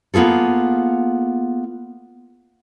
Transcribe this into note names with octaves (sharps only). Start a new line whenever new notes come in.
A#3 B3 F4 G#4 A4